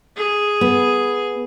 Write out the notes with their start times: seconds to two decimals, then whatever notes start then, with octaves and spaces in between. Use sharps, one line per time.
0.17 G#4
0.61 B3